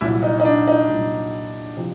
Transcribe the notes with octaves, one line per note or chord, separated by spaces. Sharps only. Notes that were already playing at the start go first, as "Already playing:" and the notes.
C2 A#2 F#3 E4
D#4
D#4
D4
D#4
C2 A#2 F#3
C3 F3